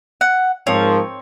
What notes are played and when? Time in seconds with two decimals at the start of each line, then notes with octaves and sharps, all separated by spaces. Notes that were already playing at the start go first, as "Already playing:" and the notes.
0.21 F#5
0.67 G#2 F3 C4 A#4 C#5